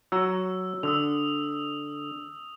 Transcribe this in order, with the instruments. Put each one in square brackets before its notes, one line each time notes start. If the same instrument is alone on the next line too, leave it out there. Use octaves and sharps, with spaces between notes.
[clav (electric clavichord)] F#3 F#4 A#5 [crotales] E6
[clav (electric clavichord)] D3 [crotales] D#6 E6 F7